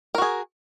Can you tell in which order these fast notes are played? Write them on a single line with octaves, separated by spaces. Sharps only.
A#4 F#4 G#4